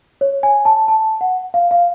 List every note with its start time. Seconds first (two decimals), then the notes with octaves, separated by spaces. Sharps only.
0.21 C#5
0.43 G#5
0.65 A5
0.88 A5
1.21 F#5
1.54 F5
1.71 F5